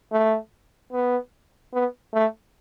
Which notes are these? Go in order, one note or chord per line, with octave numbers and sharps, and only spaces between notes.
A3
B3
B3
A3